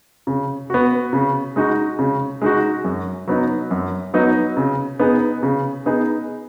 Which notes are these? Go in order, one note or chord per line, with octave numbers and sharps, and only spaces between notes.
C#3
B3 F#4
C#3
G#3 D#4 F#4
C#3
G#3 D#4 F#4
F#2
F#3 B3 D#4
F#2
F#3 B3 D#4
C#3
B3 D#4 G#4
C#3
B3 D#4 G#4